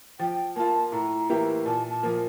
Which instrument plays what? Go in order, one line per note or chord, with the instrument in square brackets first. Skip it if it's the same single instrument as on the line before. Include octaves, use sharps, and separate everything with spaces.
[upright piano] F3 [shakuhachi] G5
[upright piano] A#3 F4 [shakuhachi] A5
[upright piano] A2 [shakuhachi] A#5
[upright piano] E3 A#3 E4 G4
[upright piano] A#2 [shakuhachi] A5
[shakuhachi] A5
[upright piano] F3 A#3